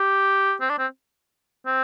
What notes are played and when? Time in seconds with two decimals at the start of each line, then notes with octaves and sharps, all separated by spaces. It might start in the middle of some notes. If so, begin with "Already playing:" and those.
Already playing: G4
0.61 C4
0.69 D4
0.79 C4
1.66 C4